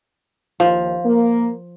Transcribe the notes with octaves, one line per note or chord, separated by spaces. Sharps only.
D#2 F3
A#3